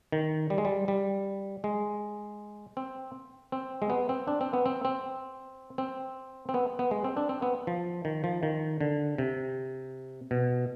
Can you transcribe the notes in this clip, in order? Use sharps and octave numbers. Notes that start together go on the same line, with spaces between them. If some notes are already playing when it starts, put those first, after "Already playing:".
D#3
G3
G#3
G3
G3
G#3
C4
C4
G#3
B3
C4
D4
C4
B3
C4
C4
C4
C4
B3
B3
G#3
C4
D4
C4
B3
F3
D#3
F3
D#3
D3
C3
B2